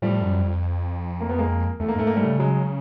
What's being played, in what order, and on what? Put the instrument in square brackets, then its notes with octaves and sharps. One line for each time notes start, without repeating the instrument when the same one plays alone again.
[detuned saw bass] A2 [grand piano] F3 G3
[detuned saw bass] F#2
F2
[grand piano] A#3
B3
G#3 A#3
[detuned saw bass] E2 [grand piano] A3
[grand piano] A#3
[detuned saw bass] G#2 [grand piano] A3
[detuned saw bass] G#2 [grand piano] A#3
[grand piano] G3 A3
[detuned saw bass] C#3
[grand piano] F#3 G#3